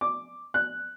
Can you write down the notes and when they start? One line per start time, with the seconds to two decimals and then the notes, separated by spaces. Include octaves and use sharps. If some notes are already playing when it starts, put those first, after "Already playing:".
0.01 D6
0.54 F#6